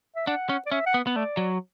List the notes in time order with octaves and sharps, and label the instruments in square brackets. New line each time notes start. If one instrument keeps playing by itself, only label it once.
[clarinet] E5
[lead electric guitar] D4 [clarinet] F#5
[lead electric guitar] C#4
[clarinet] D5
[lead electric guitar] C#4 [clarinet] E5
[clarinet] F#5
[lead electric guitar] B3
B3
[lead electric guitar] A3 [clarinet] D5
[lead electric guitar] F#3